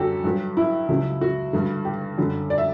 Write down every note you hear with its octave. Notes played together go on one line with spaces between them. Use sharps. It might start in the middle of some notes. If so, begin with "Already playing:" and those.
Already playing: F#2 D3 G3 F#4 G4 A4
G2 F#3
E4
C#2 C#3 F#3
F#4
G2 D3 G3
G4
F#2 D3 G3
D5
E5